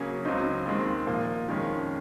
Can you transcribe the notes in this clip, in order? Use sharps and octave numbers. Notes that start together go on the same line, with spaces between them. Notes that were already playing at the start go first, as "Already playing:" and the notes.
Already playing: C#3 F#3 A#3 C#4 G#4
C#2 C#3 F#3 C4 D#4
D#2 D#3 G#3 C4
A#2 F3 A#3
F2 D#3 G#3 C#4